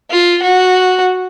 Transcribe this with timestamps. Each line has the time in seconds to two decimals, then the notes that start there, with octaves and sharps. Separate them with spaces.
0.10 F4
0.42 F#4